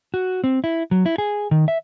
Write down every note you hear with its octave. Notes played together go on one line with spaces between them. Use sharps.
F#4
C4
E4
F#3
E4
G#4
D#3
E5